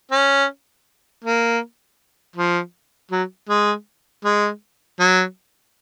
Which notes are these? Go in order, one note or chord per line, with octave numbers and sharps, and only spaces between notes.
C#4
A#3
F3
F#3
G#3
G#3
F#3